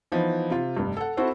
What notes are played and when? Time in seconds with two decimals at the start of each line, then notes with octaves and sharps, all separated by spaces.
0.12 E3 F3 B3 D#4
0.50 C3 F4
0.77 F1 G2
0.97 A4 F#5
1.17 C4 E4 F#4 A4 C5